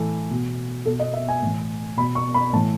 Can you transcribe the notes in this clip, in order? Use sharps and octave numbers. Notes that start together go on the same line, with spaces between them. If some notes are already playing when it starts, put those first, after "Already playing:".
Already playing: A2 E3 A4
B2
B2 A4
D#5
E5
G#5
A2 E3
B2 B5
C#6
B5
A2 E3 A5